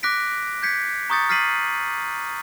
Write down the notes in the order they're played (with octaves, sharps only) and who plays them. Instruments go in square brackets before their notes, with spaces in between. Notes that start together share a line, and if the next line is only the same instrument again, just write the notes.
[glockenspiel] D6 F#6 A#6 B6 D7
G6 G#6 B6 C#7
A#5 C#6 D#6 G6 A6 C#7
F6 A6 B6 C7 D#7 F#7